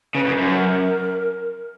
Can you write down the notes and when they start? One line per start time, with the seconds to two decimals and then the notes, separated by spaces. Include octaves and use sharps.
0.14 C#3 B4
0.26 F#2
0.38 F#2
0.45 B4
0.50 A#4